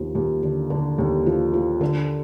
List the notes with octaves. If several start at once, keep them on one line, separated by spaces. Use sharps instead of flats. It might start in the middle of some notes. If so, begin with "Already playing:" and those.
Already playing: D#2 F3
D#2
D3
D3
D#2
F3
F3
D3